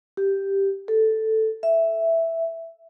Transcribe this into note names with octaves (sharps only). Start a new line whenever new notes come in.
G4
A4
E5